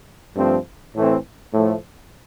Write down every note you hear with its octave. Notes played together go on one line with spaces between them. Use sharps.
G2 F3 A3 C4
A2 E3 A3 C4
A2 F3 A3